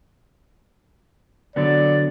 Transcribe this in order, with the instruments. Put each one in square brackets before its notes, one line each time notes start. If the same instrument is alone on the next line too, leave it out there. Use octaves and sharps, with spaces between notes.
[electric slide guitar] D3 F#3 B3 [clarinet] D5